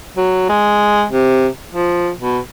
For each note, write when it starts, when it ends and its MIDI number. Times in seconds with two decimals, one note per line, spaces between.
0.17 0.48 54
0.49 1.05 56
1.11 1.48 48
1.73 2.10 53
2.21 2.39 47